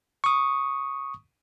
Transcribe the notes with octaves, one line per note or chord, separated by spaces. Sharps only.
C#6 D#6